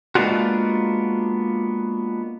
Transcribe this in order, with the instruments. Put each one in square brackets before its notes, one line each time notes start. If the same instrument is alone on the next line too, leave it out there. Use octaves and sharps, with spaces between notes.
[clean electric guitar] G#3 A#3 B3 D4 F4 F#4